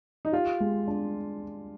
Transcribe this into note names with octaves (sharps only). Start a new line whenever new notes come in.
D#4
F4 G4
G#3
D4